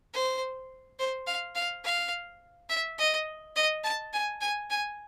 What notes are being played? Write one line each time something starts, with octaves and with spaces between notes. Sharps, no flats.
C5
C5
F5
F5
F5
E5
D#5
D#5
A5
G#5
G#5
G#5